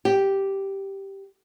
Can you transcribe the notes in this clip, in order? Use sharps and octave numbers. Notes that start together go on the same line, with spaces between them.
G4